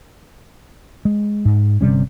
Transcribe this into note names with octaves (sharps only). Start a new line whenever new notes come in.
G#3
G#2
G1 C3 G3 C#4